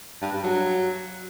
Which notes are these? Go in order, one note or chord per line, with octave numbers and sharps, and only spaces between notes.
G2
G2
F#3